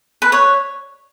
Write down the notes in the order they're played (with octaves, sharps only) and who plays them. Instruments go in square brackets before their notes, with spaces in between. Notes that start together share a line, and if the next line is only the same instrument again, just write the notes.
[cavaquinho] B4
C#5